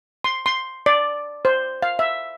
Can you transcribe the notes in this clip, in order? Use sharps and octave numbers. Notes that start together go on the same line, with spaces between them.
C6
C6
D5
C5
F5
E5